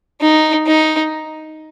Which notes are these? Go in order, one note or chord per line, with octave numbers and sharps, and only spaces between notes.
D#4
D#4